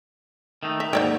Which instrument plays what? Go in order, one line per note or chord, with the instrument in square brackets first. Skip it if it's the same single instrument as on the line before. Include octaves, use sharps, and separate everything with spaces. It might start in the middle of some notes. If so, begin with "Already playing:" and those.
[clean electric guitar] D#3 A3 D#4
[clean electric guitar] D#3 [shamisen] E5
[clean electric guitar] D#2 G#2 F#3 [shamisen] C5 D5 G5